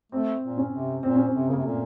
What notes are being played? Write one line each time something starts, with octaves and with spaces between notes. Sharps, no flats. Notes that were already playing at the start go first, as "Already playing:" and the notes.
A3 C4
A#2
C#4
C3
A#2 C4
C#4
C4
C3
C#3 A#3
C3
A#2 A3